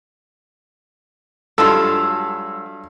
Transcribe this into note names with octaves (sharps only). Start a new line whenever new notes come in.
G2 F#3 G#3 F4 A4 E6